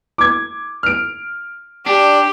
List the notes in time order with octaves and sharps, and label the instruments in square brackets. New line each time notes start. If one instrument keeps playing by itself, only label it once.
[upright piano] D6 G#6
F6 D7
[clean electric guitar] D4 [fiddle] G4